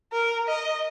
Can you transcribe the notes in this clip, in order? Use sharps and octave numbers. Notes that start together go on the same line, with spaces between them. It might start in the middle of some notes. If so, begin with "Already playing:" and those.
A#4
D#5